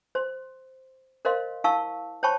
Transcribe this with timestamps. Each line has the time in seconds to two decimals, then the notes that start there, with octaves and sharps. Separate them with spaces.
0.15 C5 C6
1.25 A#4 C5 D#5 F5 C6
1.64 E4 F5 A5 C#6 E6
2.23 C5 C#5 G5 A5 B5 C#6